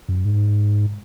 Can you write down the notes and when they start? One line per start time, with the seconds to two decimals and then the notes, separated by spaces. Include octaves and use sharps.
0.09 F#2
0.25 G#2